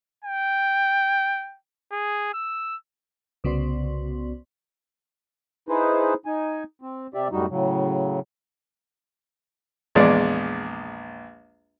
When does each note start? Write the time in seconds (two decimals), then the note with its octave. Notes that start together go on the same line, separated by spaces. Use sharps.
0.24 G5
1.92 G#4
2.34 E6
3.44 C2 C#3 B3 F#4 D5 C6
5.69 D#4 E4 G#4 B4 C5
6.26 D#4 G#5
6.82 C4
7.14 C3 G4 D5 E5
7.32 F#2 A2 G3 D#4 F#4
7.50 A2 C#3 F#3
9.95 A#1 E2 G#3 D5